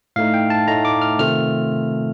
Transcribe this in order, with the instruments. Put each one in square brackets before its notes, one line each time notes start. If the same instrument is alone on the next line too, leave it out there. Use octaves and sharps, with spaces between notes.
[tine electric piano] A2 A3 D#4 F5
G5
A5
A2 A3 D#4 A#5
D6
F6
C3 D#3 A3 C4 F4 F6